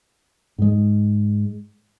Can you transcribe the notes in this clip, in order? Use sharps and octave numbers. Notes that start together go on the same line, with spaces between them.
G#2 G#3